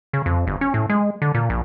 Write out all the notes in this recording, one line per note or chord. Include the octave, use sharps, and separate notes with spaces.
C#3
F2
G1
C#4
A2
G#3
D3
A#2
A#1